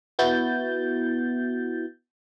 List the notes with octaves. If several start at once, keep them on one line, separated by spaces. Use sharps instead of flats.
B3 E4 F#4 G6 A6